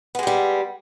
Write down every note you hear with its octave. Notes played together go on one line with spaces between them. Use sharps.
G3 G#3 B3 G4